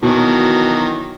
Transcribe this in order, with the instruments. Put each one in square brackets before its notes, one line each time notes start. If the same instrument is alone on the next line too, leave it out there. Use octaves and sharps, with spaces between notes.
[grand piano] B2 [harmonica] D#3 E3 F#3